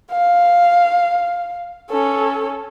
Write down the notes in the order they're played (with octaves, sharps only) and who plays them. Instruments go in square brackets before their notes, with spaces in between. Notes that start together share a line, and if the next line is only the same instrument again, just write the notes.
[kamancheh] F5
C#4 A4